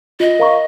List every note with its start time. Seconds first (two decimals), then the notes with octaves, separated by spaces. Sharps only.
0.20 F4 D#5
0.39 A#4 F5 A#5 C#6